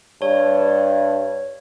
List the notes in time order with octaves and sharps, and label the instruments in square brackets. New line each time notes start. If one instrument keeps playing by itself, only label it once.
[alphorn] G2 [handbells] C#5